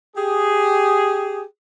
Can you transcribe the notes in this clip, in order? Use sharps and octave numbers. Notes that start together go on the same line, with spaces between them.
G4 G#4